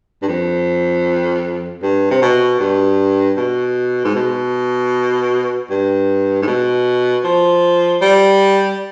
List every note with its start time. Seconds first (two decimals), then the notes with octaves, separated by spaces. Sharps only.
0.22 G2
0.28 F2
1.82 G2
2.10 C3
2.22 B2
2.60 G2
3.37 B2
4.05 G#2
4.15 B2
5.70 G2
6.42 G#2
6.47 B2
7.24 F3
8.02 G3